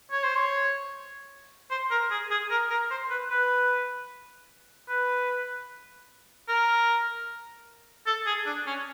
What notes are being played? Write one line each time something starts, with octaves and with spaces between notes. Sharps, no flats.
C#5
C5
C#5
C5
A#4
G#4
G#4
A#4
A#4
C5
B4
B4
B4
A#4
A4
G#4
D4
C#4